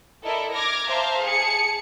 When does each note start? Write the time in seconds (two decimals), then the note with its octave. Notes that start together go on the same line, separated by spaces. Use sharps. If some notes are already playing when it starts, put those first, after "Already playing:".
0.22 E4 A4 A#4 D5 D#5
0.53 D6 F6 G#6 A#6
0.89 C5 E5 F5 A5 A#5
1.24 G#4 A5 C#7